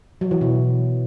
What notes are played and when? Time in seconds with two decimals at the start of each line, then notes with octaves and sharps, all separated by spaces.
0.21 F#3
0.31 E3
0.41 B2